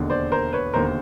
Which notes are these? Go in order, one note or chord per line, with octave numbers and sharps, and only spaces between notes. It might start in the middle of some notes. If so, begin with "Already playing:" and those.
Already playing: E1 D#2 D3
C5 D5
A#4 C5
B4 C#5
E1 D#2 D3 A#4 C5